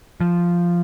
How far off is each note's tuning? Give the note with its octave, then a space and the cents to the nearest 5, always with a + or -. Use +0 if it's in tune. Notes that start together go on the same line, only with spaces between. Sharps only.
F3 -5